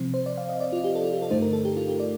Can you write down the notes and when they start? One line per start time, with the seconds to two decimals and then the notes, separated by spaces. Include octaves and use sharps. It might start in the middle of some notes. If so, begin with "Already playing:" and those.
Already playing: C3 F3 C4
0.14 C5
0.26 D5
0.37 F5
0.49 D#5
0.60 D5
0.73 F4
0.84 G4
0.95 A4
1.04 F4
1.12 G4
1.22 A4
1.30 G2 D3 A3 D#4 C5
1.42 A#4
1.53 A4
1.65 G4
1.77 F4
1.88 G4
2.00 D5